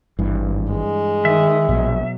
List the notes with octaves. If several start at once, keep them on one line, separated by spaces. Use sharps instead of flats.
G#1 G2 E3
G#3
D#3 E5
A#1 B2 F#3